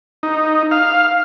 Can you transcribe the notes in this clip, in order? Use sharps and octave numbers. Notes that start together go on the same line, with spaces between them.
D#4
F5